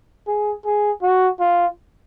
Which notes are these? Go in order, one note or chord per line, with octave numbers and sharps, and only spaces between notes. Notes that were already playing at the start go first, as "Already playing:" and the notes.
G#4
G#4
F#4
F4